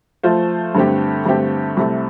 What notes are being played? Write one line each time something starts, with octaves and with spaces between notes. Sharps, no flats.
F3 A3 F4 C5
G2 D3 A3 C4 G4
G2 D3 A3 C4 G4
C2 C3 A3